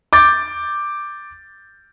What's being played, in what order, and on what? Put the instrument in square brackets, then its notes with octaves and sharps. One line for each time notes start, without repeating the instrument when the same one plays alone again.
[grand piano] D6 G6 A6